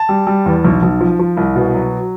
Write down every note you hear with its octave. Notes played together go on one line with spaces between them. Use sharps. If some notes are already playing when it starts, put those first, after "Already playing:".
Already playing: A5
G3
G3
E2
B1
B1
F3
F3
C2
B2
F#3